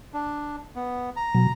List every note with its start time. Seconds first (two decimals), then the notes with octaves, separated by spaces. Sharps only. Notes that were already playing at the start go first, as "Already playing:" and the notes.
0.14 D4
0.76 B3
1.16 A#5
1.35 B2 F#3